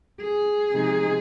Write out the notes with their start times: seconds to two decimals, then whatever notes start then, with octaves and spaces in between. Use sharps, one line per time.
0.21 G#4
0.71 C3 F3 G#3 D#4